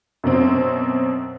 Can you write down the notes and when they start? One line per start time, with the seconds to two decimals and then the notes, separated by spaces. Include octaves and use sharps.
0.24 F#2 B2 C4